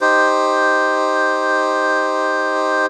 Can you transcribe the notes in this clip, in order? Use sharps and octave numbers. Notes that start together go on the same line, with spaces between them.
D#4 G4 C5